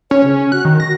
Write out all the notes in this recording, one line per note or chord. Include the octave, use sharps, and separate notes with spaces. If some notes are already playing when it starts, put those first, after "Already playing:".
C#4 C#5
C#3
F#4 F#6
D#3
A#6